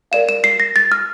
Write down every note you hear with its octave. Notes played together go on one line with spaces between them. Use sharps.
A#4 D5 F5 E7
E7
C7
A#6
A6
F6